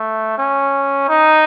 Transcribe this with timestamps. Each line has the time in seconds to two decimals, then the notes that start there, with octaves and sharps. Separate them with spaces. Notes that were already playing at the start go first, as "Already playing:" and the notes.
Already playing: A3
0.38 C#4
1.09 D#4